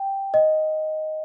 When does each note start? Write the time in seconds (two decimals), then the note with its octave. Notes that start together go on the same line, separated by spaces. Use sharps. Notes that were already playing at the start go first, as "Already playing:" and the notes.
Already playing: G5
0.34 D#5